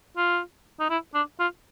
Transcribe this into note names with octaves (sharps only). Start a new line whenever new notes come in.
F4
D#4
E4
D4
F4